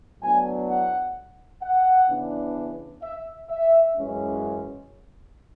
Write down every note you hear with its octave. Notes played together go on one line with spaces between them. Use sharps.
A2 F#3 B3 D4 G#5
F#5
F#5
C#3 E3 B3 D4
E5
E5
F#2 E3 G#3 C#4